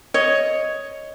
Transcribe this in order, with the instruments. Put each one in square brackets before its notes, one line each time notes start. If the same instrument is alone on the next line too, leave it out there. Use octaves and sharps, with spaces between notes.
[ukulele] C#5 [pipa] D#5